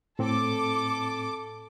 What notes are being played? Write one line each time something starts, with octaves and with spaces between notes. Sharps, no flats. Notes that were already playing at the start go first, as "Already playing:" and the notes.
A2 C4 A4 D6